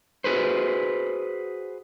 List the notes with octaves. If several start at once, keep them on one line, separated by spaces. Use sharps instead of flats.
F#4 G#4 B4 C5